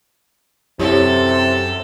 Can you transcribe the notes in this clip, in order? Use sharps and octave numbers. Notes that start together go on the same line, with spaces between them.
F#2 C3 E4 G4 A4 C#5